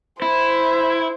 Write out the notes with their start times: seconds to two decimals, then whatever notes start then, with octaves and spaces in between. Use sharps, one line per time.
0.22 E4 C5